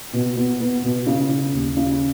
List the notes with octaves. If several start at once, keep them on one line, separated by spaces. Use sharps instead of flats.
B2
B3
B3
B2
C#3
C#3
D#2
C#3